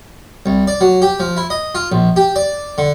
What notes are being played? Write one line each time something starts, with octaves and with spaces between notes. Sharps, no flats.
C2
D5
F#3
G4
F3
E4
D#5
F4
A#1
G4
D5
D3